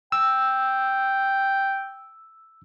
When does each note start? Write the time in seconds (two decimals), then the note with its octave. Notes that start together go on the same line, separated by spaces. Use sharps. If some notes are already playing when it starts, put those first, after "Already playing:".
0.12 G5 E6